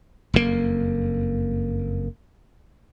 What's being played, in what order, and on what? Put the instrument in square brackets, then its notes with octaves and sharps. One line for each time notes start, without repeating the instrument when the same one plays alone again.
[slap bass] F#1 F2 A2 A#3